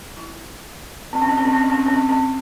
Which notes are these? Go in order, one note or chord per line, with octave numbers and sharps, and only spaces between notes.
E4
C4
C#4
C4
C#4
C4
C#4
C4
C#4
C4
C#4
C4
C4